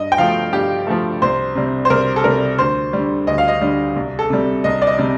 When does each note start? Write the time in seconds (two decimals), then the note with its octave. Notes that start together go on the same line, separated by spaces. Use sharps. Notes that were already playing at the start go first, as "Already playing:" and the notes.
Already playing: G2 D#5
0.12 G5
0.18 F3 A3 F5
0.53 G2 G4
0.87 F3 A3
1.22 C2 C5
1.55 C3 G3
1.85 C5
1.90 C2 A#4
2.16 A4
2.24 C3 G3 A#4
2.58 D2 C5
2.93 D3 G3
3.27 D2 D#5
3.38 F5
3.48 D#5
3.61 D3 G3
3.96 C2
4.19 A4
4.30 C3 G3
4.64 C2 D#5
4.82 D5
4.87 D#5
4.99 C3 G3